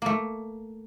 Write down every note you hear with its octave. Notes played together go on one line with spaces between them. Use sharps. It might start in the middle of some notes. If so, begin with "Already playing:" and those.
A3 A#3